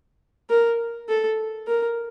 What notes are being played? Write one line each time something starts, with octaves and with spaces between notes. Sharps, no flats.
A#4
A4
A#4